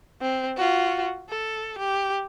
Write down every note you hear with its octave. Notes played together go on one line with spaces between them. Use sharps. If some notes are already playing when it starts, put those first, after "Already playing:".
C4
F4 F#4
A4
G4